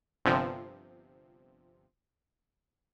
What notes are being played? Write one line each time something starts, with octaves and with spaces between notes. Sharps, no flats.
G1 C3 F3